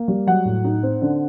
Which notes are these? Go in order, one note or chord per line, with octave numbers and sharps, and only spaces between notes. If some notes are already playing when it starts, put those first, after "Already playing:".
Already playing: A#3
G3
F#3 F#5
A2
D#4
C4
D3